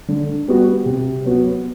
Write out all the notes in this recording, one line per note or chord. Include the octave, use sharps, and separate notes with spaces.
D3
G3 B3 F#4
C3
F#3 B3 F#4